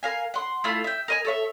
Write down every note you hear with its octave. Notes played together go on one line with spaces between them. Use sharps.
A#4 F5 G#5
F#5 C6
A3 E4 F4
E5 G5
A#4 D#5 G#5
A4 C#5 E5